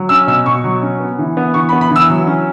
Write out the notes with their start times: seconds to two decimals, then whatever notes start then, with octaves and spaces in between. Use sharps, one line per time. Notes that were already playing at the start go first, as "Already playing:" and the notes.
Already playing: F#3
0.09 C#4 E6
0.27 B2 E6
0.46 B2 C#6
0.64 F#3
0.82 C#4
1.00 B3
1.19 E3
1.37 B3
1.54 E3 C#6
1.69 B5
1.72 B3
1.81 B5
1.91 E3 E6
2.10 F#3
2.27 C#4